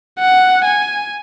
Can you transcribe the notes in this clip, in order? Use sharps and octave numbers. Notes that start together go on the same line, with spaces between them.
F#5
G#5